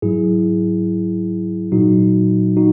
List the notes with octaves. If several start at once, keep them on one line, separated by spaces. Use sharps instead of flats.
G#2 F#3 E4 G#4
A#2 F#3 D#4 F#4
D#4 F#4